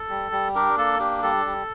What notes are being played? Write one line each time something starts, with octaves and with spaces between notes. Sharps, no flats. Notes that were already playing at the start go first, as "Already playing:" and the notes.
Already playing: A4
G3
G3
D4 G4 A#4
A#3 A4
D4 G4
G3 A4
G3